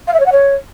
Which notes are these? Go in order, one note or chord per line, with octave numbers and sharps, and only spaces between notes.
F5
E5
C#5
F#5
C#5